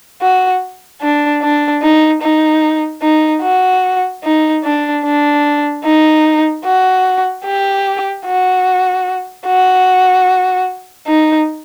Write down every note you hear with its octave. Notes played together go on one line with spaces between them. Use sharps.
F#4
D4
D4
D#4
D#4
D#4
F#4
D#4
D4
D4
D#4
F#4
G4
F#4
F#4
D#4